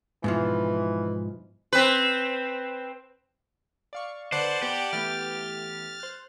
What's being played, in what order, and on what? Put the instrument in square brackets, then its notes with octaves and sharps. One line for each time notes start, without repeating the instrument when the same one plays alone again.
[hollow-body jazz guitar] G#2 B2 F3 [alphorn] E3
[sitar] C4 B4
[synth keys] D5 F5 C#6
[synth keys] D3 B4 [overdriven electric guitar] C5 [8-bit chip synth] D5 F#5 A5
[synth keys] B3 D6 [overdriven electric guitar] G4
[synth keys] E3 A3 B3 [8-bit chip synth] F6 A6
[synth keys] C5 F#6